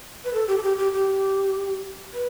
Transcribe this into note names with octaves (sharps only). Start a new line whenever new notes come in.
B4
A4
G4
A4
G4
G4
G4
B4